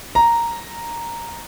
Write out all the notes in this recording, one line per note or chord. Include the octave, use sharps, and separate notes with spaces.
A#5